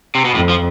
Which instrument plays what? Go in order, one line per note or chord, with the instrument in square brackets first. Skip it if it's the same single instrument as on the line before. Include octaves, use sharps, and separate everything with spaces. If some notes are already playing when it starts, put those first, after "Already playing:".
[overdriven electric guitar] C3
B2
[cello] F2 [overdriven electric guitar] A2
[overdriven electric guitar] F3